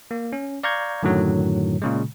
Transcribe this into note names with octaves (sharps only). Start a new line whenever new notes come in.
A#3
C#4
D5 F5 A#5 C#6 G6 G#6
F#2 A2 D3 D#3 F#3
A#2 C#3 G#3